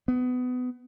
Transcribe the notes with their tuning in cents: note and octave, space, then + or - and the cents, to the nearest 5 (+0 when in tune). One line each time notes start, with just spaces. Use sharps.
B3 +25